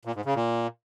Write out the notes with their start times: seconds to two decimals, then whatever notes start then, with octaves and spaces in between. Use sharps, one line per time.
0.05 A#2
0.15 G#2
0.25 C#3
0.35 A#2